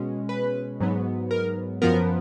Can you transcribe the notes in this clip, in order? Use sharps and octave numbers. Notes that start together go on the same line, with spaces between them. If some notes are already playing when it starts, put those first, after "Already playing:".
Already playing: B2 G#3 C#4
B4
G#2 F#3 B3
A#4
F#2 F3 B3 A#4